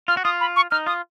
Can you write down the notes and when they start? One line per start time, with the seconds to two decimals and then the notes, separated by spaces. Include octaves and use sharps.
0.08 F4 F6
0.17 F#4
0.24 F4 D#6
0.40 B5
0.56 C#6
0.71 D#4 F6
0.86 F4 D#6